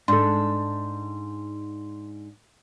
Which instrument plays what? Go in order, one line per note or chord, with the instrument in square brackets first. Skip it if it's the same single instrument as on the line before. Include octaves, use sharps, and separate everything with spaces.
[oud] G#2 [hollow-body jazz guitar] D4 A4 [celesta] C6